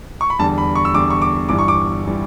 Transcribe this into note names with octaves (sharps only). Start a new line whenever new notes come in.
C#6
B5
E2 D3 G3 A5
B5
C#6
E6
E2 D3 G3 D6
C#6
D6
G1 G2 E3 G3 D6
C#6
D6
E3 G3